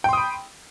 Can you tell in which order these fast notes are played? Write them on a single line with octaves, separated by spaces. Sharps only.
G5 C6 D#6 B5